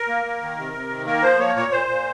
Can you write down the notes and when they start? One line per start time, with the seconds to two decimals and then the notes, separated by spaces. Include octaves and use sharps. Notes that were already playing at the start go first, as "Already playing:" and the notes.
Already playing: A#4
0.08 A#3
0.25 A#3
0.41 D#3
0.58 C3
0.74 C3
0.89 D#3
1.06 A#3 A#4
1.22 F3 C5
1.38 A#3 C#5
1.56 A#2 C#5
1.72 A#2 C5
1.88 A#2